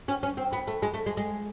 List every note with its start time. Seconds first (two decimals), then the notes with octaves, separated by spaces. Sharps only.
0.08 C#4
0.23 C#4
0.37 C4
0.53 B3
0.67 A3
0.82 G#3
0.94 A3
1.06 G#3
1.17 G#3